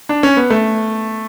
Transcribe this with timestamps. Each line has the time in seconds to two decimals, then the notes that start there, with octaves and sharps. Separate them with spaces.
0.09 D4
0.23 C#4
0.37 B3
0.50 A3